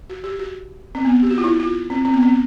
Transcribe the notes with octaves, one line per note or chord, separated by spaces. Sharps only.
F#4
G4
F#4
C4
B3
G4
F#4
F4
E4
F4
C4
C4
B3
C4